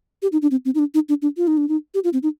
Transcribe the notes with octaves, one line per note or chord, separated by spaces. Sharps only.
G4
D#4
D4
C4
C4
D#4
D4
D#4
D4
D4
F4
D#4
D4
D#4
G4
F4
C4
D#4